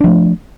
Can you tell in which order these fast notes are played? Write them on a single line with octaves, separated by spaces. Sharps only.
D4 F3 A3